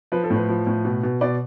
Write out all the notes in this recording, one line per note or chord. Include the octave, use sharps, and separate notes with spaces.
F3 B4
A4
A2
B4
F3
A2
B2
B2
B2 D5